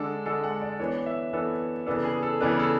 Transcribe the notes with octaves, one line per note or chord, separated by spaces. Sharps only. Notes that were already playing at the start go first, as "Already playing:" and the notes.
Already playing: D3 G#3 D4 A4
D3 G#3 D4 A4
F#5
D5
E3 B3 D4 C#5
E5
E3 B3 D4 A4
C#3 E3 B3 D4 A4
G#4
A4
C#3 E3 B3 D4 B4
A4